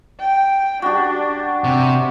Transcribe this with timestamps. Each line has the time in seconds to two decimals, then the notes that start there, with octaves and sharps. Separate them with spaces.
0.20 G5
0.82 D4 F#4 G4
1.64 C3